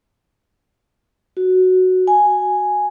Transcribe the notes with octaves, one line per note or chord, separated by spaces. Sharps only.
F#4
G#5